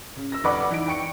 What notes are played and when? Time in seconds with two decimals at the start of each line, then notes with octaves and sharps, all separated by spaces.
0.17 C#3
0.32 E6 A#6
0.44 F1 B4 D5 F#5 B5 D6
0.71 E3 D#4 D7
0.88 G5 C#6 C#7 D7